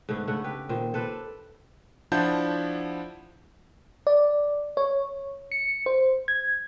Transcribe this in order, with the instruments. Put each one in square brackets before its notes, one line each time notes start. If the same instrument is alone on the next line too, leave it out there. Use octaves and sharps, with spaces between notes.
[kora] G#2 D3 A3 B3
C#3 A3 F#5
G4 B4
A#2 D#3 C5
A4 B4 C5 D5
[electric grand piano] F3 D4 E4 F#5 A5 G6
[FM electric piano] D5
C#5
C#7
C5
G#6